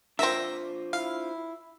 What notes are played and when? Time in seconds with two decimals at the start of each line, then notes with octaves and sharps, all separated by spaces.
0.19 A#3 C4 D4 F4 C5 E5 E6 A#6
0.93 E4 F5